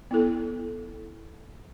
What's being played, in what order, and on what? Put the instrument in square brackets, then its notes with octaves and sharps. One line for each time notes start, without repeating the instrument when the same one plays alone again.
[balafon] B3 E4 A4